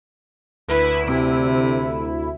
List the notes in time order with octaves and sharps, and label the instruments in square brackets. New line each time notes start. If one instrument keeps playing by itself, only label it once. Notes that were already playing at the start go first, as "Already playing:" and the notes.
[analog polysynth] D2 E4 [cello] B4
[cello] C3